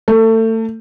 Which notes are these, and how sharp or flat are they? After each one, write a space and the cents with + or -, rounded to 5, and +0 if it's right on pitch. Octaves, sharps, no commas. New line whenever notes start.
A3 +30